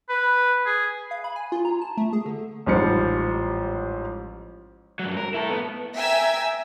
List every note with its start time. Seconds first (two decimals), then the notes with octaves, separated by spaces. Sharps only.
0.09 B4
0.66 G#4
1.11 F5
1.24 B5
1.36 G#5
1.52 F4
1.65 A#5
1.81 A5
1.97 A3
2.13 G#4
2.26 D3
2.66 A1 G#2 F3 G3 C#7
4.99 G2 F#3
5.17 A#4
5.34 E4 A4
5.50 B3
5.96 E5 G5 G#5 A#5 E6